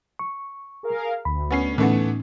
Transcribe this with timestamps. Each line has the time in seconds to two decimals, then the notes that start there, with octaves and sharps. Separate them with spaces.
0.19 C#6
0.83 G#4 A#4 F5
1.25 D2 B5
1.51 B3 C#4 C7
1.78 A2 E3 A3 B3 C#4 D#4